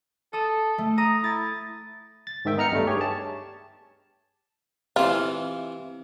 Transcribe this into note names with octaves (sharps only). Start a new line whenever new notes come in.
A4 D#6 E7
A3
A#5 D#6
E4 A6
A6
G#2 D#3 E5 G5
B3 D#4 A#5 F6 C#7
G2 G3 A3
G4 G#4 C#5
A5
C3 E3 F4